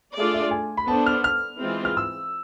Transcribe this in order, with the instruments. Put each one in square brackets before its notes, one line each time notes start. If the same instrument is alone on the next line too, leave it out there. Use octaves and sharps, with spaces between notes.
[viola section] A3 D4 F4 G#4 D5
[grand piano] E5
G#5
B5
[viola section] B3 D4 A4 C5 [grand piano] A5
[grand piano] F6
F6
[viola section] E3 G#3 C4 F4 G#4
[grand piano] F6
E6